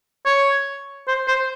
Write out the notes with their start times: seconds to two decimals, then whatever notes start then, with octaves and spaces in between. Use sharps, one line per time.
0.26 C#5
1.07 C5
1.28 C5